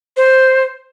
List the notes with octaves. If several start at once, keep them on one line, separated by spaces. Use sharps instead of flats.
C5